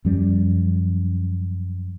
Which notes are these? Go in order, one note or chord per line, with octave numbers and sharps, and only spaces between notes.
F#2 F3 G3 C#4